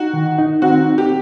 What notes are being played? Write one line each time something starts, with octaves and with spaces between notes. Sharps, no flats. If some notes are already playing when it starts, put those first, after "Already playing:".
Already playing: D#4 F#4
D#3
D#4
C4 F#4
D#4
G4